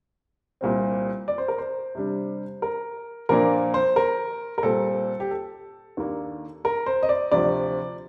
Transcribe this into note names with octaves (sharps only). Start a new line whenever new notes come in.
C2 A#2 G3 C4
D5
C5
A#4
C5
C3 G3 D4
A#4
A#2 F3 A#3 D4 A#4
C5
A#4
A#4
A#2 G3 C4 A4
G4
A4
D#2 D#3 A#3 D4
A#4
C5
D#5
D5
D2 C3 F3 D5